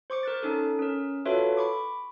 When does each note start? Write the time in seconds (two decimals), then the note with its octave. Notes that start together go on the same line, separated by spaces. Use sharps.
0.10 C5 C#6 D6 C#7
0.23 A#4 F#6 A6
0.43 C#4 D#4 A4
0.79 C#4 A#4
1.25 F4 F#4 A4 B4 C#5 E5
1.57 B5 C#6 D6